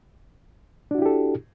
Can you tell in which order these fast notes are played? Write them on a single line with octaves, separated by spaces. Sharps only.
D4 F#4 E4 G4 A4